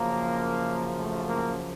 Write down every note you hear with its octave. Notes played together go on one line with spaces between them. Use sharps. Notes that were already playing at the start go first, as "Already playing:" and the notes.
Already playing: F#2 C#3 F3 A#3
A3
A#3